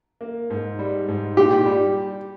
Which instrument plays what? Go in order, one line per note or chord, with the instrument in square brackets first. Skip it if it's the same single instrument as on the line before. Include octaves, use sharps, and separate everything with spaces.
[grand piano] A#3
G#2
G3
G#2
[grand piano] A#2 [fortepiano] G4
[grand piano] G3